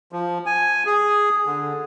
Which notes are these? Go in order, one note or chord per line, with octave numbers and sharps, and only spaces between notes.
F3
G#5
G#4
D3